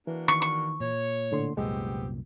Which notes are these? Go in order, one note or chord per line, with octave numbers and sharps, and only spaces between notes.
E3 A#3 D4 F#4
D#3 C#6
C#6
A#2 C#5
A2 D3 C6
C2 F#2 A#2 G#3 B3 C4 G4